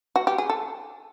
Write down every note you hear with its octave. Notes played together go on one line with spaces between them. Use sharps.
F#4
G4
G#4
A4